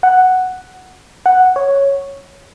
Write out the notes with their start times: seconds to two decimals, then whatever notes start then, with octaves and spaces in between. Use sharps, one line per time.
0.03 F#5
1.26 F#5
1.56 C#5